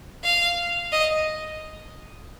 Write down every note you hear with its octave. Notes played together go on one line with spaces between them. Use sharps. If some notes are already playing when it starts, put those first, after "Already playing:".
F5
D#5